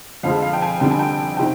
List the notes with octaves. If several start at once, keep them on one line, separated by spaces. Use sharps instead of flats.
F2 D3 F3 G#3 F5
F5
G5
G#5
F2 D3 G3 D4 G5
G#5
G5
C3 D#3 G5